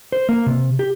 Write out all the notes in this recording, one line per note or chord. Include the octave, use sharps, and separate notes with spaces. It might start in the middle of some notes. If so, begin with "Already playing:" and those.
C5
A#3
C3
G4